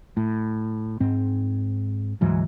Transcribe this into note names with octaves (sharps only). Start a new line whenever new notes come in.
A2
G#2 C4
D2 G#2 E3 F#3